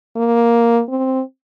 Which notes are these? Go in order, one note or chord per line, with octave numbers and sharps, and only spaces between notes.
A#3
C4